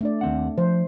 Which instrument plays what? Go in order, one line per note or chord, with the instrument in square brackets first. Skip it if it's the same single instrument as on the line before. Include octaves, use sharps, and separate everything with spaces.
[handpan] A3 D4 D5
[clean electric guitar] D#2 C4 F#5
[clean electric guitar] F3 [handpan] C5